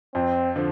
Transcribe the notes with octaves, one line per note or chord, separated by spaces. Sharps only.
F2 C4
D3 F3